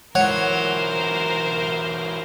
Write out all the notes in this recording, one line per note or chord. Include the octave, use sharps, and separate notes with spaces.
E3 F#3 A#4 C5 C#5 F#5